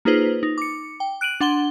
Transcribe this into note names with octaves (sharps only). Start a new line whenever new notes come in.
A#3 D#4 F4 G#4 B4 C5
D#4
D6 C#7
G5
F#6 D7 D#7 F#7
D4 F#5 C6 G7